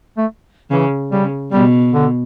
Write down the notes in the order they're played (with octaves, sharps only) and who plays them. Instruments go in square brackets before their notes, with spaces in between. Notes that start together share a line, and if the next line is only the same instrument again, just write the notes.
[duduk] A3
[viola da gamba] C#3 [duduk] E3
[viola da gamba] C#3 [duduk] G3
[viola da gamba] B2 [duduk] G3
[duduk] D3